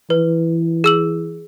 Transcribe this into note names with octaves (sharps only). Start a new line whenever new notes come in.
E3 B4
G#4 E6 F#7